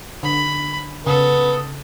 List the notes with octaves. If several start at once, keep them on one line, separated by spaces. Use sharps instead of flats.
D3 B5
C#3 B3 A4 D#6